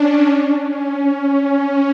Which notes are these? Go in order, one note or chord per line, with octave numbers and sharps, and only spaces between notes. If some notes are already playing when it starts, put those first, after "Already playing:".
Already playing: C#4 D4
C#4
C#4